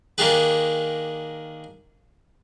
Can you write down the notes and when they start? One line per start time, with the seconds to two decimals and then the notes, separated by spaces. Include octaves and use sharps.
0.18 D#3 A#3 D4 G4 G#4 B4